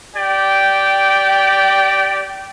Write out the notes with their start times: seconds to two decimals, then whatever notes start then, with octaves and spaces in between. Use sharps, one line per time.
0.16 G4 D5 G5